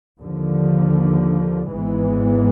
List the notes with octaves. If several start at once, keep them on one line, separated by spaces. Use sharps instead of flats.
D#2 D3 F3
G#1 G#2 E3 G#3 B3